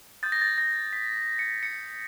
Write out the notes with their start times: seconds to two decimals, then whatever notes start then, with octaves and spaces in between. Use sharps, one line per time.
0.23 D#6 G6 A6
0.32 A#6
0.42 A6
0.58 A#6
0.93 B6
1.39 C#7
1.63 C#7